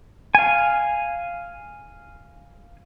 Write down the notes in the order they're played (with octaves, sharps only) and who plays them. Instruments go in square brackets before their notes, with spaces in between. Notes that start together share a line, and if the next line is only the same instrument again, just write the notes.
[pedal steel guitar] F5 G#5